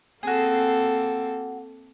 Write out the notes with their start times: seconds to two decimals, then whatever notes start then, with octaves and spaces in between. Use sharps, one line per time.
0.23 A#3 C4 F#4 G#4 A4